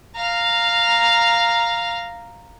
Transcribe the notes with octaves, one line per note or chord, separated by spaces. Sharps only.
F5 A#5